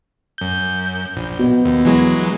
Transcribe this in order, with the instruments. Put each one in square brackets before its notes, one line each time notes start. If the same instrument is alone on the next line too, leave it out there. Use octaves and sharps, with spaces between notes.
[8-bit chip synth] F#2 G6
A#1
[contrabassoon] B2
[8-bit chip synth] D#2
E3 F#3 G#3